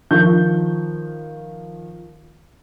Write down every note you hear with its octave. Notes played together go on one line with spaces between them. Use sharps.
D#3 F3 C#6 G6